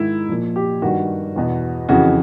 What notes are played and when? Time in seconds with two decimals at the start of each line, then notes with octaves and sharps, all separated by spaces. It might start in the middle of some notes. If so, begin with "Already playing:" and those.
Already playing: G#2 D#3 E4
0.29 A#2 F3
0.56 G4
0.82 G2 D#3 F#4
1.36 E2 B2
1.89 F2 C#3 E3 F#4